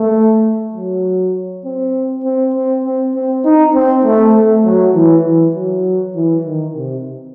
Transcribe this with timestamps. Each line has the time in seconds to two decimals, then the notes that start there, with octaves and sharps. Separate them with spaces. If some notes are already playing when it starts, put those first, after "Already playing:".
Already playing: A3
0.74 F#3
1.64 C4
2.24 C4
2.54 C4
2.84 C4
3.14 C4
3.44 D#4
3.74 C4
4.05 A3
4.34 A3
4.65 F#3
4.95 E3
5.25 E3
5.55 F#3
6.15 E3
6.45 D#3
6.75 C3